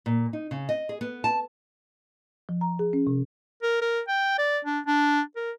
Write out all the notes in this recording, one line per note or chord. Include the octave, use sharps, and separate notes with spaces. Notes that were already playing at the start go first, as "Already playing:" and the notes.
A#2
D#4
C#3
D#5
G#4
B3
A5
F3
A#5
G#4
C#4
C3
A#4
A#4
G5
D5
D4
D4
A#4